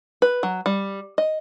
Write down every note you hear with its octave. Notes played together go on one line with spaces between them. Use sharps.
B4
F#3
G3
D#5